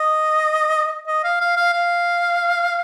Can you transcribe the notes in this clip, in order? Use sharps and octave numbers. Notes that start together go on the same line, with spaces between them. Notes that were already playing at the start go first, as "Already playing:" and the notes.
Already playing: D#5
D#5
F5
F5
F5
F5